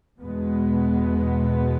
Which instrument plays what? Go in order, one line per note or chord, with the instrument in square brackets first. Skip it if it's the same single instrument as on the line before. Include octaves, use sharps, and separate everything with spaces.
[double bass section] E2 B2 G#3 B3